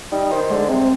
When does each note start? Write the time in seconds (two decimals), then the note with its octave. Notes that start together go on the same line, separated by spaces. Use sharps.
0.12 G3 D#4
0.31 D#3 C5
0.50 D3 G#3
0.69 C3 C4